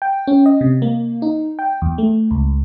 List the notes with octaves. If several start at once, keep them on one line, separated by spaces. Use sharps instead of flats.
G5
C#4
D#5
C3
A#3
D#4
G5
E2
A3
C#2